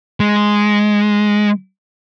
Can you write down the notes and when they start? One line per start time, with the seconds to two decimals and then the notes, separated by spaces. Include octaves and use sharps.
0.20 G#3